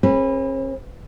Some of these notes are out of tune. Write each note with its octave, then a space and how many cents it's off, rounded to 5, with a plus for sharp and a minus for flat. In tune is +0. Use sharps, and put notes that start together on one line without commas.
C#4 -45 G#4 +10 B4 -5